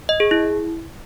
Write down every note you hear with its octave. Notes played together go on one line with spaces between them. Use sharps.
D#5
G#4
E4